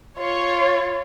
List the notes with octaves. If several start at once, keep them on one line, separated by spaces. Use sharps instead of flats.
F4 C#5